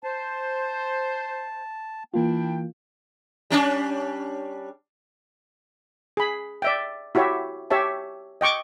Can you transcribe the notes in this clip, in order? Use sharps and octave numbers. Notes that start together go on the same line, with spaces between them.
C5 A5
E3 A#3 D4 E4 F4 G5
G3 C#4 D4
G#4 B5
D5 E5 G5
E4 F#4 G4 C#5 E5
G4 C#5 E5 A5
D#5 G5 C#6 D6